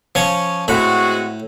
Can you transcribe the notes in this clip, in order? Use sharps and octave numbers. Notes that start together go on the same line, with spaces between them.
F3 C#4 C#5
A2 G#3 C4 F#4 B5